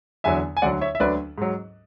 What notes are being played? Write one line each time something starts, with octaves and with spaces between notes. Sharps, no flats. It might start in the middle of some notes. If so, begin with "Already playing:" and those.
E2 D3 F#3 E5 G#5
G#5
D2 D3 F#3 D5 F#5
C#5 E5
E5
D2 D3 F#3 B4 D5
G#2 F#3